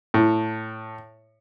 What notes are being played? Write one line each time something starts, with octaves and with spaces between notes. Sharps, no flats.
A2